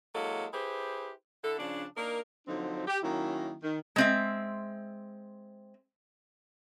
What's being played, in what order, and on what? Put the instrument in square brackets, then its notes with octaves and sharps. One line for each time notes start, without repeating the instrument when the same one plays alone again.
[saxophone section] F#3 G#3 A#3 E4 A4
E4 G4 G#4 B4 C5
D3 E4 A4
C#3 F3 D4
A#3 D4 D#4 A#4
D3 F3 F#3 C4 D4 D#4
G4
D#3 F#3 A#3 C#4 E4
D#3
[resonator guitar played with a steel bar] G#3 C4 E5